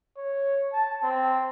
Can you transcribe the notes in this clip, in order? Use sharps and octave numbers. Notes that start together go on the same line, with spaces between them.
C#5
A5
C4